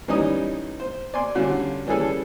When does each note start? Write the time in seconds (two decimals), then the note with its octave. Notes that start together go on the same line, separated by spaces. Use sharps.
0.08 E3 G3 C#4 D#4 D#5 D#6
0.80 C5
1.14 D5 G#5 C6
1.35 D3 G3 C#4 F4 F#4
1.87 E3 G3 C#4 G#4 A4 G#5